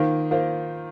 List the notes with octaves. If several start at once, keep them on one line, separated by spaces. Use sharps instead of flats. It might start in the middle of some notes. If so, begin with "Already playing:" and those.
Already playing: D#3 A#3 F4 C5
A#3 F4 C5